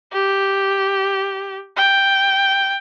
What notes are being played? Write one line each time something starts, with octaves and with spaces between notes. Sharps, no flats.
G4
G5